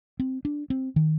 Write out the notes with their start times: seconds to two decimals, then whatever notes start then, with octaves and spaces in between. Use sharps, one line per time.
0.20 C4
0.45 D4
0.70 C4
0.96 D#3